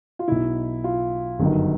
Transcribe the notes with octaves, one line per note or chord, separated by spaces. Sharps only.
F4
B1 B2 E4
F4
G1 F#2 D#3